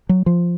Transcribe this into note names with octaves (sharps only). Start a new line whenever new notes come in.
F#3
F3